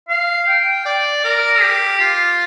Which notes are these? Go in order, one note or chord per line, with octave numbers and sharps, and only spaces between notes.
F5
G5
D5
A#4
G4
F4